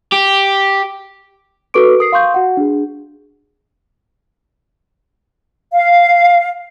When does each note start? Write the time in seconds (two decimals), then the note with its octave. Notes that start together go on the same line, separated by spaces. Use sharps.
0.12 G4
1.74 F#4 A4 B4 C#6 D6 D7
1.99 A#4 D#6 C7
2.12 F5 C6 C#6 G6
2.34 F#4 F#5
2.57 D4 G#4
5.73 F5